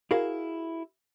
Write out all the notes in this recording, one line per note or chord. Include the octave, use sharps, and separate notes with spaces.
E4 F#4 G#4 A#4 F5